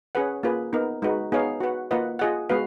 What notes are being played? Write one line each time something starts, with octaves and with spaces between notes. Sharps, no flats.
C#4 G#4 B4 F#5
A#3 F4 G#4 B4
B3 D#4 A#4
G#3 D#4 F#4 B4
B3 D#4 G#4 C#5 F5
F#4 B4 F#5
A#3 F4 B4 D#5 F#5
F4 G#4 D#5 F#5
G#3 B3 F#4 B4 F5